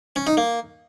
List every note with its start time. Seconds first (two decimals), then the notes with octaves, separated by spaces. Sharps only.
0.16 C#4
0.27 D#4
0.37 A#3